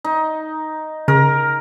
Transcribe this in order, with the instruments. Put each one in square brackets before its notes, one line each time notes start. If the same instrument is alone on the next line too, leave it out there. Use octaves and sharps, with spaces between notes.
[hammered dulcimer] D#4
[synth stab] C#3 [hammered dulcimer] A#4